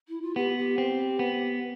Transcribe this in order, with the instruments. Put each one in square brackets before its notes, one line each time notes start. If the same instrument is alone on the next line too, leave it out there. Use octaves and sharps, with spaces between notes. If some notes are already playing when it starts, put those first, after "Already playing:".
[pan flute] E4
F4
[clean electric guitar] B3 [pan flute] G4
[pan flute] G4
[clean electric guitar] C4
B3